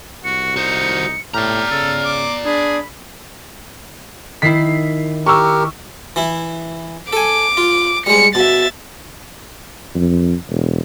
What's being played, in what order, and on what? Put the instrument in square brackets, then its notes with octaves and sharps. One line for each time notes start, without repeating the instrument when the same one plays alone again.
[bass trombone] C2 [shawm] F#4 [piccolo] C#7
[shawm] D#4 [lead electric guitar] F#4 C5
[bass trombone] A2 [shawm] G4 [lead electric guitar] D5 A#5 [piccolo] F6
[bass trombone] C#3 [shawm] A4
[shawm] D6
[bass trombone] D4 [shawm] G#4 [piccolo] B5
[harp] D#3 E4 [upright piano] B6 C7
[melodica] G4 A#4 [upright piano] C#6 E6
[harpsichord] E3 E4
[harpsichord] A4 G#5 [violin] D6
[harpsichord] F4
[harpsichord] G3 G#3 [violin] C#7
[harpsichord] B2 [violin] E5 A6
[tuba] F2
E1